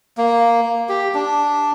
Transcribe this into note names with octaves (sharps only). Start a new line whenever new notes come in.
A#3
G4
D4